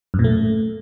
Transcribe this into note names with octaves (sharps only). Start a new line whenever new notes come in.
F#2
A#2
A3